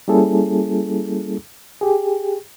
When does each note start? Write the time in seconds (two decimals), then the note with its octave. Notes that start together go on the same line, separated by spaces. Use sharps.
0.08 G3 A#3 C#4 E4 G#4 A4
1.81 G4 G#4